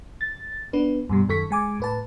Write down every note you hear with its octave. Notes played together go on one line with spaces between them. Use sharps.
A6
B3 D4 B4
G2 B2 G3
F#2 D#3 A4 C#6 B6
G#3 G#5 D6
A2 B4 A5